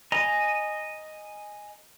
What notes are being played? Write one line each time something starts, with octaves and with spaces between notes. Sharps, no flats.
D#5 G#5 A#5